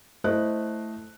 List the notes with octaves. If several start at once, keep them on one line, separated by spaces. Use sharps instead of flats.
A3 E4 C5 D#5 F#6